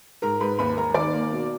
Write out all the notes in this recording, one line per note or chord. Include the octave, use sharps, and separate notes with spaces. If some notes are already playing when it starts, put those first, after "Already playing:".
G#2 A#4 A#5
G#2 B4 B5
D#2 B4 B5
D#2 A#4 A#5
D#3 D5 D6
A#3
B2